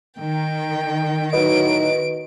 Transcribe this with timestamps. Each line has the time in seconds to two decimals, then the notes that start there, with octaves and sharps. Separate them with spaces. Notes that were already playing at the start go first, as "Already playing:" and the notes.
0.20 D#3 G5
1.33 A2 F#3 D#4 F#4 B4 D#5 D7